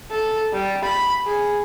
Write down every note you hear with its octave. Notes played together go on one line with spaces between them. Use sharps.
A4
G3
B5
G#4